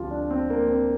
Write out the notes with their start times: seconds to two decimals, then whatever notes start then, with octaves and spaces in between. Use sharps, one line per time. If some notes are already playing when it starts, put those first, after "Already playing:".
Already playing: D2 C3 F3 F4 G4
0.11 D4
0.30 C4
0.50 A#3
0.69 C4